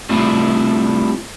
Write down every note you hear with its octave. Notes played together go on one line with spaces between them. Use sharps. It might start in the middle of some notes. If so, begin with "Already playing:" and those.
G3 A3 C4 D4 E4 F4